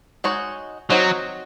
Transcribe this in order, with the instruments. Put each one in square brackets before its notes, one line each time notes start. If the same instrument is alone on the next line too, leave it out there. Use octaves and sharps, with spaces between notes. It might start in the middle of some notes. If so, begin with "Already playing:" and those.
[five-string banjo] G#3 D#4 F#4 C#5
[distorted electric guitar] F#3 [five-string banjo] C4 D#4 F#4 C#5